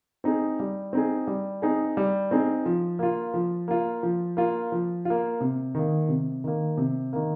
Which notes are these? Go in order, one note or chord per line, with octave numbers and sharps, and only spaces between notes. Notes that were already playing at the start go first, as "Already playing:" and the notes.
C4 D#4 G#4
G3
C4 D#4 G#4
G3
C4 D#4 G#4
G3
C4 D#4 G#4
F3
A#3 F4
F3
A#3 F4
F3
A#3 F4
F3
A#3 F4
C3
D#3 A#3
C3
D#3 A#3
C3
D#3 A#3